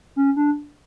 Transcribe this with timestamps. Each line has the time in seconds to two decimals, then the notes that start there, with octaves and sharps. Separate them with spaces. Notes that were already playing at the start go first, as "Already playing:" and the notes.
0.16 C#4
0.36 D4